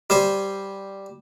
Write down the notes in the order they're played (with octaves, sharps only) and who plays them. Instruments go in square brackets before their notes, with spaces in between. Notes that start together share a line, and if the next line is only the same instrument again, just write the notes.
[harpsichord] G3 C5 G#5